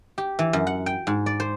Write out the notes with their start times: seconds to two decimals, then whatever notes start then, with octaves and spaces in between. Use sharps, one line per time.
0.18 G4
0.39 E3
0.53 F#2
0.67 F#5
0.86 G5
1.07 G#2
1.26 D5
1.40 C5